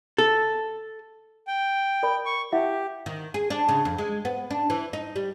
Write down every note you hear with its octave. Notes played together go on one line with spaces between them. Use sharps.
A4
G5
A#4 D5 B5
C#6
E4 G4 E5 F#5
D#3
G#4
D4
C#3
F2
G#3
B3
D4
E3
D#4
G3